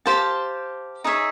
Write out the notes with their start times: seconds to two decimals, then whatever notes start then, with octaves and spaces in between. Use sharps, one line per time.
0.06 G4 C5 F5 A5
1.04 D#4 G#4 C#5 E5